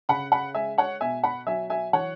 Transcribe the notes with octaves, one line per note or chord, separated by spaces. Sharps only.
C#3 F#5 B5
F#5 B5
G#3 E5 G#5
C#5 F#5
B2 E5 G#5
F#5 B5
F#3 E5 G#5
E5 G#5
E3 C#5 F#5